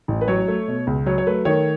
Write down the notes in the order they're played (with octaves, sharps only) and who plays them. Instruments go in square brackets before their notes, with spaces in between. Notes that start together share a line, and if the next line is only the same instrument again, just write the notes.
[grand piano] A1
B4
F#3 C#5
A3
B2
C#2
F#3 C#5
C#5
A3 B4
D#3 C#5